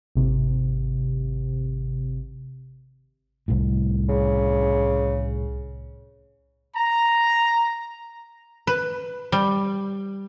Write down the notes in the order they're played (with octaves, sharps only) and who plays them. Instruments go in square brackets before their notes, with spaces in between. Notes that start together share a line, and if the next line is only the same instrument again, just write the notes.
[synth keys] G#1 C3
[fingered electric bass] C2 A2
[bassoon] C#3
[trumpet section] A#5
[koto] B4
G3